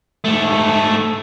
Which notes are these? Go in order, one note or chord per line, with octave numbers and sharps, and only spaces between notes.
G#2 A3